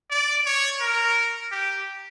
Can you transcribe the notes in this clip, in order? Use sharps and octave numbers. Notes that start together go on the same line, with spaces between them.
D5
C#5
A#4
G4